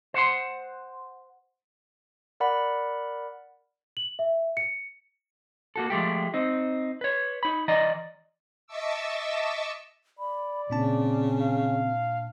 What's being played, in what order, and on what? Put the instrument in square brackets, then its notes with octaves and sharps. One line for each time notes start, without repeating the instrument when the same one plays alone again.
[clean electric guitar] C5 F#5 C6
[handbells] A#4 D5 F#5 B5
[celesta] F#7
E5
C#7
[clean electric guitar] A#3 F#4 A4
F3 G#3 A3 G4
C4 D#4
B4 C#5
D#4 B5
E3 D5 D#5 A#5
[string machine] D#5 E5 A5 C#6 D6 E6
[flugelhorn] D5 [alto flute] B5
[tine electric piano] A#2 D4 A5 [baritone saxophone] C#3 [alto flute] C4
[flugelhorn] F5